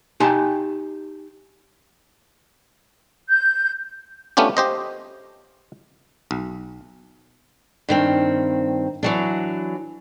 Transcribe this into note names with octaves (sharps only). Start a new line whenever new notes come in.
D#4 G4 G#5 A5 C6
G6
A3 B3 C#4 D4 F4 G4
G4 C5 D#5
B1
G2 D#3 C4
E3 F#3 D4